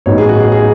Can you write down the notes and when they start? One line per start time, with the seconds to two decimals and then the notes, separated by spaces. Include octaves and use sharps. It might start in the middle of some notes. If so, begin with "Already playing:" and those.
0.06 A1 A2 F#3 B3 D#4 C#5
0.18 G#4
0.29 F#4
0.40 G#4
0.52 G#4